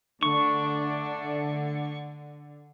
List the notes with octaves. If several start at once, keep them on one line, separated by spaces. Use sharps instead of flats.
D3 A3 D4 C#6